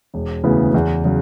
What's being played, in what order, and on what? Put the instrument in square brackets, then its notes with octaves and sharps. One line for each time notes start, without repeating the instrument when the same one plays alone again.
[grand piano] E1
D2 C#3 E3 B3
E2
C#3 F#3